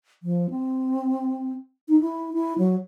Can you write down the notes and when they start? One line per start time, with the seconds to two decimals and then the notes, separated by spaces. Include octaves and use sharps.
0.23 F3
0.50 C4
1.88 D#4
2.01 E4
2.34 E4
2.58 F#3